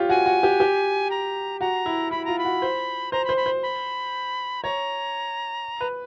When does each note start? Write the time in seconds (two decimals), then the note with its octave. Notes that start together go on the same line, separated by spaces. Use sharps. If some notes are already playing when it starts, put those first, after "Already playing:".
Already playing: F4 G4 C#5
0.09 F#4 G#5
0.26 F#4
0.43 G4
0.60 G4
1.11 A#5
1.61 F#4 A#5
1.86 E4
2.11 E4 B5
2.25 F4 A#5
2.39 B5
2.45 F#4
2.62 C5
3.12 C5 A#5
3.25 B5
3.29 C5
3.37 B5
3.46 C5
3.63 B5
4.63 C#5 A#5
5.81 B4